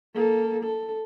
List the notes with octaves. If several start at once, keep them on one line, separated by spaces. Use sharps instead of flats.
A#3 A4
A4